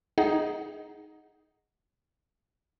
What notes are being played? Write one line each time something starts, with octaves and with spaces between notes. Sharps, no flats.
D#4 G#4 D#5 F#5